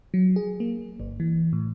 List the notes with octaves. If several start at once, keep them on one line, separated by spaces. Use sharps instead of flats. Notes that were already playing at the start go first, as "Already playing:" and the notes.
F#3
G#4
A#3
G1
E3
A2